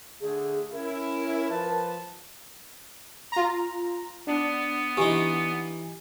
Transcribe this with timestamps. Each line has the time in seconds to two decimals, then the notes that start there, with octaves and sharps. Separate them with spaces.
0.21 D3 A3 G#4
0.72 C#4 E4 A#4
1.50 F3 B4 A5
3.32 F4 A#5
4.27 B3 D4
4.97 E3 D#4 G4